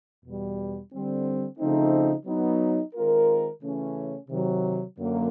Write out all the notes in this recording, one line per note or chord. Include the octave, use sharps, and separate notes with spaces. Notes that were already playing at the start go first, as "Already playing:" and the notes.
E2 B2 G3
D3 G3 C4
C#3 F3 A3 C4 D#4
F#3 B3 D#4
D#3 G#3 C4 F4 A#4
C#3 E3 A3 C#4
C3 D#3 F#3
F#2 D3 F#3 A#3